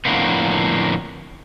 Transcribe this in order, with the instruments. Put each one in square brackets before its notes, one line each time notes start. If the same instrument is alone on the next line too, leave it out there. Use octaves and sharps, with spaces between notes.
[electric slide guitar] F2 A2 D3 A#3 B3